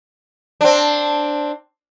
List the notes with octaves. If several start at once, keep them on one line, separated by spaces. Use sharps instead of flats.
C4 D4